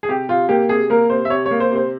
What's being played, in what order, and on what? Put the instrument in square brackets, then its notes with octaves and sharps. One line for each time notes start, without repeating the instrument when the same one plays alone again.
[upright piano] G#4
C3 G4
C3 F4
A#3 G4
C3 G#4
A#3 A#4
C3 C5
E5
C3 C#5
C#5
A#3
C5
C3 C5